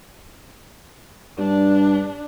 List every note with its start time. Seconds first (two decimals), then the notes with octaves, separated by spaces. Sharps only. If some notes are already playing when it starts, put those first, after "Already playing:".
1.38 G2 D4